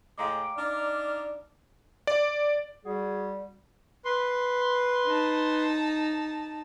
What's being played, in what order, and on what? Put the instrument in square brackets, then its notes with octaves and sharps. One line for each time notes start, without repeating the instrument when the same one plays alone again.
[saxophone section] A2 G#3 [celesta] F5 A#5 D6 [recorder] G5
[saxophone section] D4 D#4 [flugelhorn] D5 [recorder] F6
[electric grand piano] D5
[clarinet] G3 [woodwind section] F#4 G#4
[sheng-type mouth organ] B4 C6
[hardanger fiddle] D#4 A5